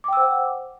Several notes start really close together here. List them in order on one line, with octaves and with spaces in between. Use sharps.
D6 G5 E6 C5 F#5